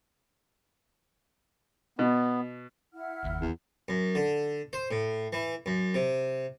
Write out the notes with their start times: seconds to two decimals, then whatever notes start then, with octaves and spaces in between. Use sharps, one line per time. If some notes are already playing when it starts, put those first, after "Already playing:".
1.99 B2 B3
2.93 E4 F#5 F6
3.25 F#1 D#2
3.41 E2
3.88 F#2
4.15 D3
4.73 C5
4.91 A2
5.33 E3
5.66 F#2
5.94 C3